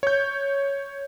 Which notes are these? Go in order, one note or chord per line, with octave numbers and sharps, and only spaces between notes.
C#5 G6